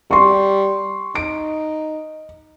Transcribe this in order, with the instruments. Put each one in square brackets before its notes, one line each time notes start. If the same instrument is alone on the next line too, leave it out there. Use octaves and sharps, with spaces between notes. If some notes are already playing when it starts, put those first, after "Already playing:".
[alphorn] G3 [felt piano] C6 C#6
[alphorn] D#4 [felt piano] D7